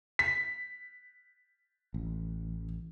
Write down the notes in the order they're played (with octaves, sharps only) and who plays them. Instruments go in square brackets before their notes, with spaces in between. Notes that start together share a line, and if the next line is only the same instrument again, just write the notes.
[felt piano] B6
[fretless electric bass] A1